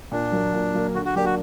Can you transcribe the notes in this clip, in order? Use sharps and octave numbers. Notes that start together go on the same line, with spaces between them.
A#2 D4
F#3 A#3
A#2
F#3 A#3
D3 F#4
F#4
F#3 A#3 D4 G4
F#4